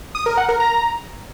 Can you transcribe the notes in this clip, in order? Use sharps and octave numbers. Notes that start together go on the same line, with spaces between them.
D#6
A#4
F#5
A#4
A#5